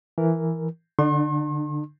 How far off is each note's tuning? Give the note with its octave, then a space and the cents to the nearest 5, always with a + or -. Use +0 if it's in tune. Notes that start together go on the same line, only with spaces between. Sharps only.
E3 +0 A#4 +0
D3 +0 D4 +45 C6 +45